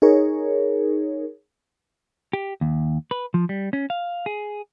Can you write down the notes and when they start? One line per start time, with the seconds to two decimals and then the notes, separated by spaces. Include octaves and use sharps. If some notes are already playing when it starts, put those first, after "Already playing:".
0.02 D#4 G#4 A#4 C#5
2.33 G4
2.61 D#2
3.11 B4
3.34 F3
3.49 G3
3.73 C#4
3.90 F5
4.26 G#4